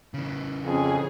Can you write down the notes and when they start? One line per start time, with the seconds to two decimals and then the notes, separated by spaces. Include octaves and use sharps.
0.14 C#3 E3
0.66 F2 C#4 G#4